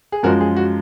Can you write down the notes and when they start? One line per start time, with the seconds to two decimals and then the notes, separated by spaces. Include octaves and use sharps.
0.12 G#4
0.23 F#2 F3 G#3 F#4 A#4
0.41 G#4
0.56 F#4